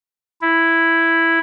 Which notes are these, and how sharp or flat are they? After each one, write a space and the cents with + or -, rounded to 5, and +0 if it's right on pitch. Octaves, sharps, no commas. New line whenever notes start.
E4 +0